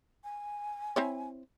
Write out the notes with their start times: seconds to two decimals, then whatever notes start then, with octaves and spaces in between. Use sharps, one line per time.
0.24 G#5
0.96 C4 E4 C#5